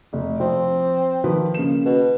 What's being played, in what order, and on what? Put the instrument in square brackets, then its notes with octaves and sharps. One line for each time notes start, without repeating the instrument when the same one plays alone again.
[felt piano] F1
[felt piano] F3 [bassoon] C4
[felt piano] D#3 F3 B4
C#3 A#3 E7
[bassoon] B2